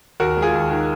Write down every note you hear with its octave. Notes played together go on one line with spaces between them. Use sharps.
D#2 F#4 A#4
G#3
F4 G#4
D#2
D#3